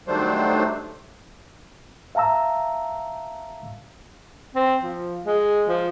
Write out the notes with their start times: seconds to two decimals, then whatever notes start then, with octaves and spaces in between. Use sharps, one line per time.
0.07 D#3 F#3 G3 A3 D4 C5
2.15 E5 F5 A5 A#5 E6
4.55 C4
4.82 F3
5.26 G#3
5.68 F3